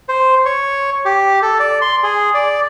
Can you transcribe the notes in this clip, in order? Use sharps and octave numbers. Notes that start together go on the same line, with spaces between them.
C5
C#5
G4
A4
D5
C6
G#4
D5